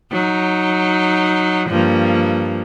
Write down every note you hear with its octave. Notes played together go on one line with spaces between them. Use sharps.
F#3 D#4
G2 F3 A#3